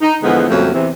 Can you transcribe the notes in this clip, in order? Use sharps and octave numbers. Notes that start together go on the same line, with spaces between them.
D#4
E2 D3 F3 G#3 B3 F#5
F2 A#2 C#3 F#3 G3 A3
E2 C3 E3